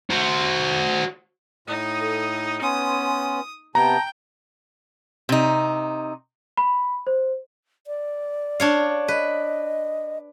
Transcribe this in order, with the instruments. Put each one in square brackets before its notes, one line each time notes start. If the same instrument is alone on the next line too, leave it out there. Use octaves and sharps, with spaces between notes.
[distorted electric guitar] F#4 C5
[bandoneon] A2 D#6 [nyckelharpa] D#4
[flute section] A4
[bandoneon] B3 C#4 [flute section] B4 G#5 C6 [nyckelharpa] D#6
[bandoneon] C3 B3 [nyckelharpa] G5 [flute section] A5 G6 [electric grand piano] A#5
[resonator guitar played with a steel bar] C3 D#4
[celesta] B5
C5
[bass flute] D5
[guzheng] D4 C#5 F5
[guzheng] B4 [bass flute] D#5